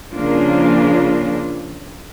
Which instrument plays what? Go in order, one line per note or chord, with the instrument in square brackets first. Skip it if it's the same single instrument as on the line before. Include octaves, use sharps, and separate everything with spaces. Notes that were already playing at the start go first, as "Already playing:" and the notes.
[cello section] C#3 F3 A#3 D4 F4